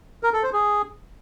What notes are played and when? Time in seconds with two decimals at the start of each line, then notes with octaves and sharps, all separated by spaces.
0.23 A#4
0.33 A4
0.43 C5
0.53 G#4